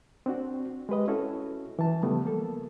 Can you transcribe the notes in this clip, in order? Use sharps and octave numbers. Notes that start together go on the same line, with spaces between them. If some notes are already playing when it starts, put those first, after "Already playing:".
C4 D4 F#4
G#3 G4 B4 D#5
C#4 E4 F#4 A4
E3 A5
C#3 F3 G3 A3 B3
A#3 A4